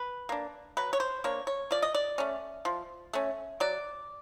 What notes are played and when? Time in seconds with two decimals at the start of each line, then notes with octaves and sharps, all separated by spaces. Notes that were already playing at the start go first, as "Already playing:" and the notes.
Already playing: B4
0.29 A#3 D4
0.77 F#3 B4
0.93 C#5
1.00 C5
1.24 A#3 D4 C#5
1.47 C#5
1.71 F3 D5
1.82 D#5
1.95 D5
2.18 A3 C#4
2.65 F3
3.13 A3 C#4
3.60 F#3 D5